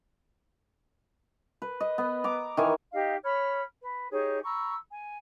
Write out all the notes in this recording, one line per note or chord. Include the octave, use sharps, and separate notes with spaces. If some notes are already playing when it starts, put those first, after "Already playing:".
B4
D#5
B3
A#5 D6
D#3 E3 G#5
D#4 G4 D#5 F5
C#5 B5 F6
B4
D#4 G4 G#4 C#5
A#5 B5 C#6 E6
G#5